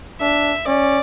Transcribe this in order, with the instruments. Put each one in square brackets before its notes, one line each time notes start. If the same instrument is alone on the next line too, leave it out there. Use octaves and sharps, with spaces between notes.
[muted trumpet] D4 [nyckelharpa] E5
[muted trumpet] C#4 [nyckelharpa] D5